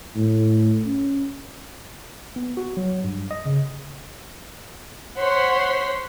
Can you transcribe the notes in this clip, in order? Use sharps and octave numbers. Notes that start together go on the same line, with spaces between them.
A2
C#4
B3
F#4
F#3
G2
D#5
C#3
C5 C#5 F#5 C6 B6